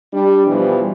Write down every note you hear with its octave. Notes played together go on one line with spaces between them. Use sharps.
G3 D4
B2 E3 F3 G3